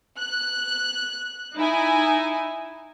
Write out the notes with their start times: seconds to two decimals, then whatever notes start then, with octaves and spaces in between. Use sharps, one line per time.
0.17 F#6
1.56 D#4 E4 G#5